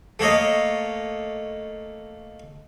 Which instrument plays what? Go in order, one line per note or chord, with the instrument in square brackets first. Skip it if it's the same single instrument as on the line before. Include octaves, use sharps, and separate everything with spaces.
[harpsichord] A3 A#3 C#5 D#5